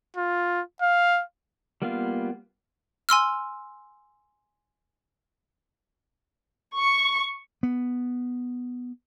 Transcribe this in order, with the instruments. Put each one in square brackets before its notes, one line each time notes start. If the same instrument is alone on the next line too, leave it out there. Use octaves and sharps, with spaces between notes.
[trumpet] F4
F5
[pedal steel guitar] G3 A#3 B3 F4 F5
[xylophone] G#5 C6 E6 F6
[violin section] C#6
[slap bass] B3